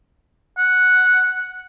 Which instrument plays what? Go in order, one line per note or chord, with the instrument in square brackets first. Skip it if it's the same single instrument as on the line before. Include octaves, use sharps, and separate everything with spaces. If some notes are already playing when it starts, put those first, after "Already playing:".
[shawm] F#5